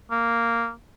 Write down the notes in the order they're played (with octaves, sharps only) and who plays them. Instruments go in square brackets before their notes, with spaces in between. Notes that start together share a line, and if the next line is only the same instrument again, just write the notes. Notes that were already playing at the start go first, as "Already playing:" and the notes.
[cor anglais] A#3